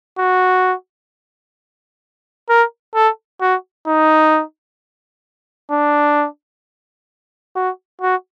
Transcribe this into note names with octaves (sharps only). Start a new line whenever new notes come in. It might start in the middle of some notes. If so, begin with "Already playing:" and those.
F#4
A#4
A4
F#4
D#4
D4
F#4
F#4